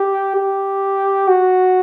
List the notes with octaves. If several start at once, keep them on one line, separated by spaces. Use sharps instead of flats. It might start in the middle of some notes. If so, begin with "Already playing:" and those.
Already playing: G4
G4
F#4